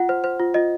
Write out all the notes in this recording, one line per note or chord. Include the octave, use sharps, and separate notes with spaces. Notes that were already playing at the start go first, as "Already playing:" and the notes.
Already playing: F4 F#5
C5
C5
F4
F4 D#5